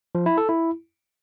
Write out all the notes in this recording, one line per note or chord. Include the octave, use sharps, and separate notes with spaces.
F3
E4
A4
E4